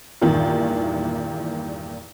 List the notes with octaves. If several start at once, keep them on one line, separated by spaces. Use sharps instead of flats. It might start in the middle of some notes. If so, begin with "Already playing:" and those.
E2 G2 A#2 D#3 E3